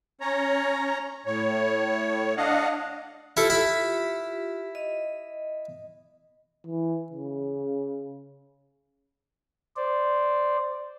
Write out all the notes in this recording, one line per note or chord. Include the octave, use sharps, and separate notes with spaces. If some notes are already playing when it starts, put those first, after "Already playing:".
C#4 C#5 A#5
A2 C#5
D4 D#5 F5 F#5
E4 F4 G4 A4
E4 B5
D#5
E3
C#3
C5 D5